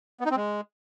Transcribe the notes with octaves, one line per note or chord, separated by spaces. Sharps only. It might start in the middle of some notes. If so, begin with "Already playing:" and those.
B3
D#4
C4
G#3